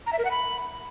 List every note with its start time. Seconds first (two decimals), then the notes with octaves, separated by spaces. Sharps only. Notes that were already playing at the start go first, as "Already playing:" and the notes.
0.07 A#5
0.13 E5
0.19 A#4
0.25 F#5
0.31 B5